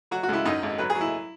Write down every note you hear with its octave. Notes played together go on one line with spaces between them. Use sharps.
F#3 F#4
F#4
C#2 E4
F#2 D#4
G#1
F#3 B4
G#4
F#3
E4